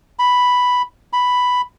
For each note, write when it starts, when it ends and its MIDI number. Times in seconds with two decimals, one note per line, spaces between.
0.19 0.82 83
1.13 1.61 83